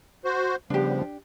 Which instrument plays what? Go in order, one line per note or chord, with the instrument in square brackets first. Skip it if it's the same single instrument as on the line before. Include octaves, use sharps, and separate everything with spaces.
[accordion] F#4 C5
[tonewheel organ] C#3 G3 B3 [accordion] F3 [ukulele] D4 G4